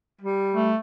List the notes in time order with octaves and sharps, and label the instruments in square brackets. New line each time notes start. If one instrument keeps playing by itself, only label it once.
[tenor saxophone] G3
[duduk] A3